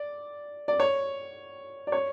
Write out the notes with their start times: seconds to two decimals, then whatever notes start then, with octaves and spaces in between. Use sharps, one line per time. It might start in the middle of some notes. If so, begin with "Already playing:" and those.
Already playing: D5
0.68 D5
0.80 C#5
1.87 D5
1.92 C#5